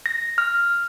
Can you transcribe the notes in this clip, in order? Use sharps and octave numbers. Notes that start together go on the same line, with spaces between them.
A#6
F6